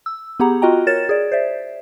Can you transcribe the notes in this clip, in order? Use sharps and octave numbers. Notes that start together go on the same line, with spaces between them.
E6
B3 G4 G#4 F#5 A#5
F4 F#4 D#5 G5 A#5
A#4 C#5 A6 E7
G#4 D5
C5 D5 E5